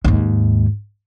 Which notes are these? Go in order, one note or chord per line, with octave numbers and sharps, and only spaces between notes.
D#2 G#2